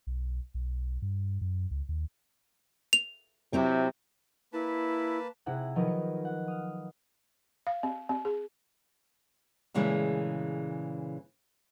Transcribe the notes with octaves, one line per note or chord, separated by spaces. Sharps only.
B1
B1
G2
F#2
C#2
D#2
F7
C3 F#3 C4 E4
A#3 E4 B4 A5
C3 E4 G#4 F#5 E6 F#6
D#3 F3 F#3 A#4 B4 D#5
C#7
F#5
D#6 F6
F5
C4
C4
G#4
A#2 C#3 E3 G#3 A3